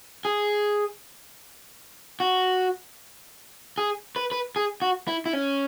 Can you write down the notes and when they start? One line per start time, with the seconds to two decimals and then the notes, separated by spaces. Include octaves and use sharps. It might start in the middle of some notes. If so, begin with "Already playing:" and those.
0.25 G#4
2.20 F#4
3.78 G#4
4.16 B4
4.32 B4
4.56 G#4
4.82 F#4
5.08 E4
5.26 E4
5.33 C#4